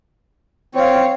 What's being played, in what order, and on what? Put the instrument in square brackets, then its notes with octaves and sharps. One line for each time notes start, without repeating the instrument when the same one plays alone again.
[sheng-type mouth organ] C4 [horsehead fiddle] C#5 F5